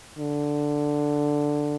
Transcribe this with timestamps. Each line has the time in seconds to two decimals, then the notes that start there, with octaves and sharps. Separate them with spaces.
0.18 D3